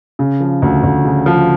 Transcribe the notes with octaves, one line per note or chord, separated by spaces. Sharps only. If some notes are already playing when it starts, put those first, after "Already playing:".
C#3
F3
D2
D2
C#3
F3